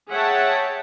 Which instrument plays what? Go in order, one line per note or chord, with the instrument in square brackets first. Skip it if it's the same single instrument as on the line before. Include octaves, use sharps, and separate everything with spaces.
[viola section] G#4 C#5 E5 F#5 G5 A5